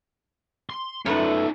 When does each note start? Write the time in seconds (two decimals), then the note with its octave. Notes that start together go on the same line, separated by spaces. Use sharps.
0.70 C6
1.06 F#2 A3 C#4 D#4 B4